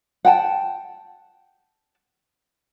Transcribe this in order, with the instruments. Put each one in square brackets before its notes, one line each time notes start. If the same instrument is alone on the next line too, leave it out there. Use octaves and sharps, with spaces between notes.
[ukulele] F#5 G5 A5